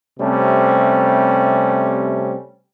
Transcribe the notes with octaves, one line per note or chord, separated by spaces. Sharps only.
C3 G3 A3 C4 C#4